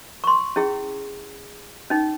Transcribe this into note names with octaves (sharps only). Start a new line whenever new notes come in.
C6 C#6
C#4 E4 G#4
C#4 D#4